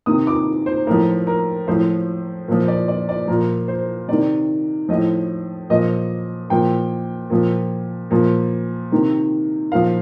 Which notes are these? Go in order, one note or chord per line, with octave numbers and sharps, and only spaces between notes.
C3 D#3 D#6
D6
C5
A2 F3 A#4
A#4
A2 F3 C5
A#2 F3
D5
D5
D5
A#2 F3 A#4
C5
C3 D#3 D5
A2 F3 D#5
A#2 F3 D#5
A#2 F3 G5
A#2 F3
A#2 F3
C3 D#3
A#2 F3 F5